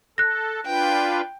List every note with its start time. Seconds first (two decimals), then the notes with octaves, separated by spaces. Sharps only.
0.18 A4 F#6 A#6
0.66 D4 F4 B4 G5